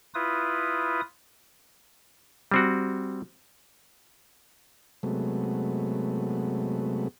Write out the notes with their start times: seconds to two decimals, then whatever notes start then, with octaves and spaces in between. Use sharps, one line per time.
0.15 E4 F4 B4 D#6
2.51 G3 C4 F#4
5.03 C3 F#3 G#3 A3 B3